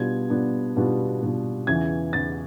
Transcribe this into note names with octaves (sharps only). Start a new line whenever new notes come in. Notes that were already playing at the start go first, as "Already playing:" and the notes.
Already playing: B2 G3 B3 D4 F4 G#6
B2 G3 B3 D4 F4
B2 G3 B3 D4 F4
B2 G3 B3 D4 F4
E2 C#3 E3 G#6
E2 C#3 E3 A6